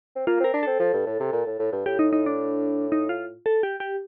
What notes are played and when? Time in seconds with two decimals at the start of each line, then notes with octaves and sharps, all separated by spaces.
0.16 C4
0.27 A#3 F4
0.40 C4 A#4
0.54 D4
0.63 C4 A4
0.80 F3
0.94 G2
1.06 A2
1.20 C3
1.33 A#2
1.47 A2
1.59 A2
1.73 G2
1.86 A2 G4
1.99 D#4
2.13 D#4
2.26 D4
2.92 D#4
3.09 F4
3.46 A4
3.63 G4
3.80 G4